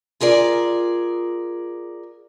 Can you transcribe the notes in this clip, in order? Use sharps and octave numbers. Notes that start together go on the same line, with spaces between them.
F4 G#4 A#4 D5